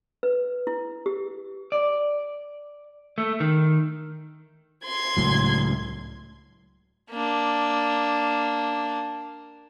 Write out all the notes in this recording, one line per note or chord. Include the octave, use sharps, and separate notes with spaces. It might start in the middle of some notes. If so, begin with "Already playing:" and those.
B4
E4
G4
D5
A3
D#3
C6 G#6
C#2 A2 F#3
A#3 D4